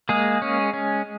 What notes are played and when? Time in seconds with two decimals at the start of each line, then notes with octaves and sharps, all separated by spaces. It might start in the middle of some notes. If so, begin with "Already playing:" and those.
0.09 G#3 A#3 G#4
0.42 C#4
0.74 C#4